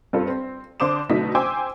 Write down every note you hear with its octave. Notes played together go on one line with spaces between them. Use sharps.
G2 C4 F4 A4
C4
D3 C5 D6 D#6 E7
B2 D3 F#3 A3 D#4 B6
C5 G5 G#5 C6 D6 E6